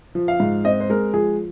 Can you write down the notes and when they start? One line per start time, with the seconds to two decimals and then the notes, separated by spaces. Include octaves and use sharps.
0.15 F3
0.28 F5
0.40 G#2
0.64 C4 D#5
0.80 C5
0.90 G#3 A#4
1.14 F3 G#4